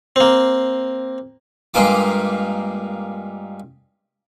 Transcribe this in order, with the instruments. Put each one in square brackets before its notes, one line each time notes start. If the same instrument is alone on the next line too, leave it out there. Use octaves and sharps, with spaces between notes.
[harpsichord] A#3 C4
G2 G#3 A#3 F4 D6